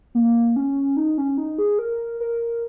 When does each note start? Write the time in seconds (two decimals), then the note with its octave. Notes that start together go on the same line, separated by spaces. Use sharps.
0.15 A#3
0.56 C#4
0.97 D#4
1.18 C#4
1.38 D#4
1.58 G#4
1.79 A#4
2.20 A#4